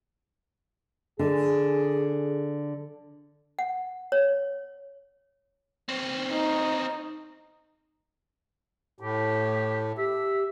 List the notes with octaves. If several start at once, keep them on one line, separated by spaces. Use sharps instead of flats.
D3 G#4
F#5
C#5
C4 C#4
D#4
A2 G4
G4 E5